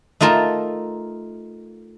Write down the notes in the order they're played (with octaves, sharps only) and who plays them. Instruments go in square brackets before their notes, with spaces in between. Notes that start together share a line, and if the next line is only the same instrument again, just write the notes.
[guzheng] A3 D#4 F4 A#4 A5